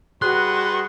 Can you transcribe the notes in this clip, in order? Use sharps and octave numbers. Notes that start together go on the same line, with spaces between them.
G3 F#4 G#4 B4 C6 F#6